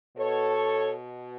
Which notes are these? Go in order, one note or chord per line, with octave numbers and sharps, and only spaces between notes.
B2 A4 C#5